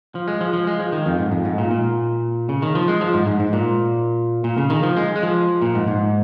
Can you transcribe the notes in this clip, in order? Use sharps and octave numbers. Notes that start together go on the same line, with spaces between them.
F3
G#3
F3
F3
G#3
F3
D#3
F2
G#2
F2
G#2
A#2
A#2
C#3
D#3
F3
G#3
F3
G#2
G#2
G#2
A#2
A#2
C#3
D#3
F3
G#3
G#3
F3
A#2
G#2
G#2